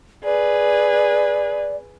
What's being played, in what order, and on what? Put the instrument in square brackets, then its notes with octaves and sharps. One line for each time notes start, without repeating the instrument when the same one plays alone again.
[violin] G#4 B4 [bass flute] D5